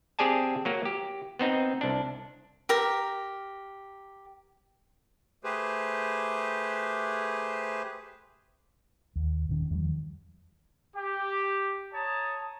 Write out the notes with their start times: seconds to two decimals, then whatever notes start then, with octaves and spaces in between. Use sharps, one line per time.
0.19 C4 G4 G#4 D5 G#5 A5
0.65 F#3 A#3
0.85 G4
1.39 B3 C4 D#4
1.81 C2 D4
2.69 G4 A#4
5.44 A3 G4 G#4 B4 C5
9.16 D#2
9.49 D#1 D3 D#3 C#4
9.71 E2 D#3 F3 G3
10.96 G4
11.94 C#5 A5 A#5 D#6